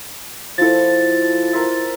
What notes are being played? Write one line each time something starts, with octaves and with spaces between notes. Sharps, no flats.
F3 E4 A4 A6
A#4 C5 E5